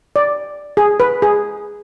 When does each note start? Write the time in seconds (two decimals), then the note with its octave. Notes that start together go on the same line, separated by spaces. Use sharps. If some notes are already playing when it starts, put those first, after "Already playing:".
0.16 D5
0.77 G#4
1.00 B4
1.22 G#4